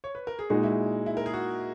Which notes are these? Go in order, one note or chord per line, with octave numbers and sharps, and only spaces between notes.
C#5
B4
A#4
G#4
A#2 G#3 D#4 F#4
E4
E4
A#4
G#4
F#4